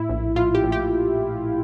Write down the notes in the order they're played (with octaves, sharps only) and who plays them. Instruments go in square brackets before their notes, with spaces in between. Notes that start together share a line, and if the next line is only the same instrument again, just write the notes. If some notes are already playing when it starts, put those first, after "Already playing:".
Already playing: [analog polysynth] A2 E4
A#1
A#1 F4
G4
A#1
G4